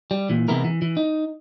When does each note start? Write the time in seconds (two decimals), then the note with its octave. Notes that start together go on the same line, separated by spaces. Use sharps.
0.11 G3
0.30 A#2 E3
0.48 C3 E3 G#3 B3 E4 A#4
0.64 E3
0.82 E3
0.97 D#4